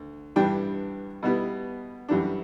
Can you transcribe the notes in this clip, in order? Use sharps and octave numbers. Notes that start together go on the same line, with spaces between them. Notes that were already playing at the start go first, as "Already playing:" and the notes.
Already playing: D2
G2 E3 G3 D4 G5
B2 G3 B3 E4
F#2 E3 G3 D4